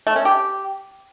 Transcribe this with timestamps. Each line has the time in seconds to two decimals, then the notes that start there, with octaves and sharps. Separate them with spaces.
0.07 A3
0.16 C#4
0.25 G4